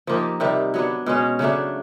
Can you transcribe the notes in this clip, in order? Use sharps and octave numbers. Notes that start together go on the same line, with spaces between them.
F3 A#3 D#4 G4
C3 D#3 G3
F#3 B3 D4
B2 G#3 C#4
C#3 F#3 A3 D4